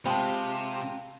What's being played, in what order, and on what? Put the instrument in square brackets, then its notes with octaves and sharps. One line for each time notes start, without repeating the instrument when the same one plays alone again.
[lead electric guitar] C3 [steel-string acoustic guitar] G#3 F4 G4 [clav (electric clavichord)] C4 [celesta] A5 B5